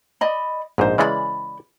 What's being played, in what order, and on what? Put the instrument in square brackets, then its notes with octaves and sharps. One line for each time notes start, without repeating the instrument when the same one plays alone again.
[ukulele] D5 D#5 B5
[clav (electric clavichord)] A#1 G#2 [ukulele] D#4 C5
[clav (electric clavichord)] C#3 E3 G#3 [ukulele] D5 D#5 B5